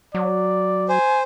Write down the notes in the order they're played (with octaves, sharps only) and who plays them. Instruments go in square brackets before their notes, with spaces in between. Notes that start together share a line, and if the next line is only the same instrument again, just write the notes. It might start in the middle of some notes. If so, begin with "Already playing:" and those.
[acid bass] F#3 [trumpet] D5
[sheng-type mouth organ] C5 [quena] G#5